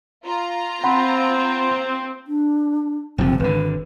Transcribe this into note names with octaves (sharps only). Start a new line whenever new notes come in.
F4 A#5
C4 F#5 B5 C6
D4
F#1 C3 F3 C4
G#1 D3 B4